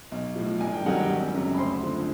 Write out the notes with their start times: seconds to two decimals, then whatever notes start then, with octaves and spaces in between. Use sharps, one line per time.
0.12 B1
0.36 A2 F3
0.60 G1 G#5
0.74 G5
0.85 G2 D#3 F#3 F#5
0.99 G4 G5
1.09 G#1
1.34 F#2 C#3 F#3
1.54 B5
1.58 D2 C5 C6
1.83 D3 F3